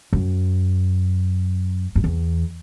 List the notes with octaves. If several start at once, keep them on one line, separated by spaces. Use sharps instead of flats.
F#2
F#2
E2